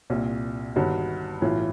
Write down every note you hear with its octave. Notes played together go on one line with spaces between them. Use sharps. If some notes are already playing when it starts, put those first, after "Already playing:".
C2 A#2
G1 G2 D#3 F#4
B1 A2 E3 F4